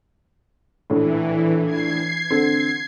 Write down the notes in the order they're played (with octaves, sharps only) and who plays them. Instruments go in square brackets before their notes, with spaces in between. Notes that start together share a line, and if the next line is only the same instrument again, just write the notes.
[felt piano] A#1 A2 [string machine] E3
[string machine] G#6 C7
[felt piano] D3 C4